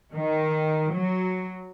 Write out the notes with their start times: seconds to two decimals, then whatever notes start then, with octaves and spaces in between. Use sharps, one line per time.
0.13 D#3
0.92 F#3